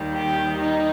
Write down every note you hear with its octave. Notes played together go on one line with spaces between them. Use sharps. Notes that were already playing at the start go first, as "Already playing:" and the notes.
Already playing: D#2 D#3 G3
G4
D#4